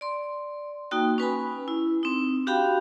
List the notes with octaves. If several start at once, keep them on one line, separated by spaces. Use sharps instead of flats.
D5 C6
A#3 D#4 F#4 G5
C#4 B4 G#5 B5
E4
C4 D#4
D4 F#4 G4 F5 G5 B5